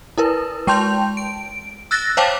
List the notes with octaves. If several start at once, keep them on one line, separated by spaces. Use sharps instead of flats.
E4 A#4 B4
G#3 G5 A5 C6 G6 F7
D7
E6 F#6 A6 A#6
C5 C#5 F5 G5 A5 D6